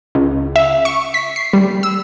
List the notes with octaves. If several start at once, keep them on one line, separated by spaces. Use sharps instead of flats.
C#2
E5
C#6
B6
C7
G3
E6